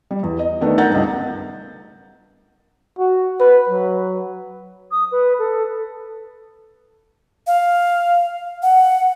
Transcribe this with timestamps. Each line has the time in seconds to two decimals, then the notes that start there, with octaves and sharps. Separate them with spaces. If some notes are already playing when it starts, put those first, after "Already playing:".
0.11 G3
0.23 E2
0.39 D#5
0.61 D#3 A3 B3 D4
0.78 A#4 F#5 A#5 G6 A6
0.90 C#2 G2
2.99 F#4
3.40 B4
3.69 F#3
4.91 D#6
5.12 B4
5.39 A4
7.47 F5
8.62 F#5